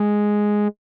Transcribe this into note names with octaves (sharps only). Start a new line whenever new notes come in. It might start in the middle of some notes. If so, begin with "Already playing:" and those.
Already playing: G#3